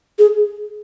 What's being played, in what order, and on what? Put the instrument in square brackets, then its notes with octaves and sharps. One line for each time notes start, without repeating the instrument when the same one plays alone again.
[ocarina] G#4